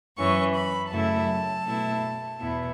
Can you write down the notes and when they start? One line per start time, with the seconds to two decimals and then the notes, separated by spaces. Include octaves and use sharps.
0.17 F#2 E3 C#4 C#6
0.55 B5
0.92 F#2 C#3 F#3 A3 E4 A5
1.67 B2 A3 E4
2.41 E2 B2 B3 E4